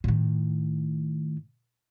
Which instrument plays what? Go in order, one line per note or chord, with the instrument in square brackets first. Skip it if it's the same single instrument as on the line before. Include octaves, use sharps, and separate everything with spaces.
[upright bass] A2 D#3